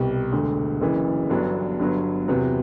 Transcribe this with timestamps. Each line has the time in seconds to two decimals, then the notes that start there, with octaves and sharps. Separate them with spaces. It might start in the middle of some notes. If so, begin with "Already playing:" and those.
Already playing: C2 B2 G3
0.31 E1 D2 D3
0.81 F#1 F#2 E3
1.30 G1 G2 F#3 B3 D4
1.79 G1 G2 F#3 B3
2.28 E2 C3 F#3 B3